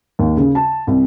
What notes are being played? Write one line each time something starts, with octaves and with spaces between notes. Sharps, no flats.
D#2
C#3
A5
C2